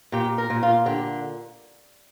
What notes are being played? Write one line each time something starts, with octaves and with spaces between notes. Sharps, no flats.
A#2 G4
A#4
A#2
F4
D3 G4